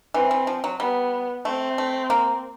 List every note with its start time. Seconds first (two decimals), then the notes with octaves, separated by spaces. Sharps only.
0.14 E3 C4
0.31 E3
0.47 F3
0.64 F#3
0.80 G3 B3
1.45 A3 C4
1.78 A3
2.10 A#3